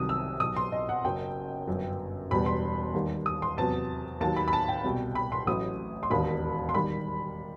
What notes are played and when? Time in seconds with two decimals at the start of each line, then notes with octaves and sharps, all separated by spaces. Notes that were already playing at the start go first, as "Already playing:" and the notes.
Already playing: C2 C3 D#3 F#3 D#6
0.09 E6
0.40 B1 B2 F#3 D#6
0.56 C6
0.72 D#5
0.89 F#5
1.04 F#1 F#2 F#3 G5
1.67 G1 F#2 F#3
2.31 E1 E2 B2 G3 B5
2.46 C6
2.94 D#2 D#3 G3
3.26 D#6
3.42 C6
3.57 E2 C3 F#3 A5
4.20 D#2 D#3 F#3 A5
4.36 B5
4.48 B5
4.53 A5
4.69 G5
4.84 C2 B2 G3
5.15 B5
5.32 C6
5.47 A1 A2 F#3 D#6
6.03 C6
6.10 E1 D#2 D#3 B5
6.69 C6
6.74 D#3 G3 B5